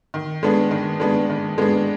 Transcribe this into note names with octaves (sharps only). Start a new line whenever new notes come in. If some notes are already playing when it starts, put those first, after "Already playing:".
D#3
G#3 B3 D4
D#3
G#3 B3 D4
D#3
G#3 B3 D4